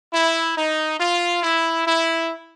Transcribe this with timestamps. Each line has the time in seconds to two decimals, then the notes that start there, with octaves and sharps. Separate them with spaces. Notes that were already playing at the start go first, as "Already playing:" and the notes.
0.13 E4
0.56 D#4
1.00 F4
1.43 E4
1.86 E4